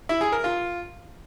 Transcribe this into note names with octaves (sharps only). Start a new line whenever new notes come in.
E4
G#4
A#4
F4